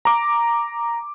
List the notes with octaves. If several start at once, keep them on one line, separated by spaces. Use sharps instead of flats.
A#5 D6